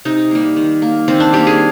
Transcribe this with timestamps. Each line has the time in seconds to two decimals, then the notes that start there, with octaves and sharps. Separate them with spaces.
0.05 C3 D#4
0.31 G3 A#3
0.56 D#3
0.82 A#3
1.08 D#3 C4
1.20 D4
1.33 G3 A#3 G4
1.47 G#4